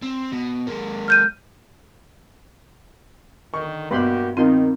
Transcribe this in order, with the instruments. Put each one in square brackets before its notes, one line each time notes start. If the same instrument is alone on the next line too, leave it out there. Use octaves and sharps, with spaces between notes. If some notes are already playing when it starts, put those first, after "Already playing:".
[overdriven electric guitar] C4
B2
G#3 A#3
[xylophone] F6 G6 D#7
[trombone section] D3 D#3 [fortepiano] C#6
[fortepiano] G2 B2 [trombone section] A#3 F#4 G4 [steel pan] B4 B5 C6
[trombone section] D#3 [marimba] C4 [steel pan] D#4 F4 C6